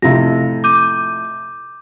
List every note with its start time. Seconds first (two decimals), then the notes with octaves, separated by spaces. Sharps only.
0.02 F2 A2 C3 F5 A#6
0.64 D6 G6 D#7